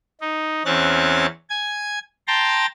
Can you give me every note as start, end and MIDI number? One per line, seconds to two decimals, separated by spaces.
0.21 0.63 63
0.65 1.26 40
0.65 1.26 60
0.65 1.26 61
0.65 1.26 73
0.65 1.26 90
0.65 1.26 93
1.50 1.99 80
1.50 1.99 92
2.27 2.66 79
2.27 2.66 81
2.27 2.66 82
2.27 2.66 84
2.27 2.66 93